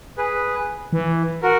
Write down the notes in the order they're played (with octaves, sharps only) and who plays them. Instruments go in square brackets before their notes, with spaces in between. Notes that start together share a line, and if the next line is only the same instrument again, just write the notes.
[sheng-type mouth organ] G#4 B4
[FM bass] E3
[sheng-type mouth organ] F#4 A#4